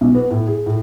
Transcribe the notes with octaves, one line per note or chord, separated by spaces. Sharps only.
B1
B3
A2
G#4
A2